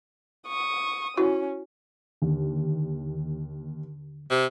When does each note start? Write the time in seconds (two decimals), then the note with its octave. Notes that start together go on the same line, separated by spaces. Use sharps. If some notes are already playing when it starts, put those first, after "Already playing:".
0.47 C#6 D#6
1.17 C#4 E4 F#4
2.22 D#2 D3
4.30 C3